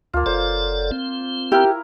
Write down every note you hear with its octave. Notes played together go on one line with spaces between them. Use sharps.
D2 A#3 F4
F#1 A4 C5 D5
C4
E4 G4 A#4